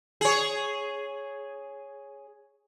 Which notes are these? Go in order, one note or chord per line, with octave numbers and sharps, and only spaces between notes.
G#4 C#5